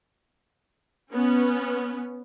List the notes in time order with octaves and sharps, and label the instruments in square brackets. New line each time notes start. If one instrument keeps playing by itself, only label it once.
[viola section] B3 C#4